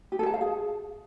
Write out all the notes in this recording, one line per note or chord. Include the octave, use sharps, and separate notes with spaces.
G4
A4
A5
F5
G#4